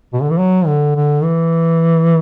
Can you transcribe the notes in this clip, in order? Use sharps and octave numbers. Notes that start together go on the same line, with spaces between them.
B2
D3
E3
F#3
D3
D3
E3